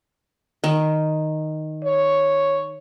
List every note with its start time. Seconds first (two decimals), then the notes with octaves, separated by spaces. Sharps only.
0.64 D#3
1.85 C#5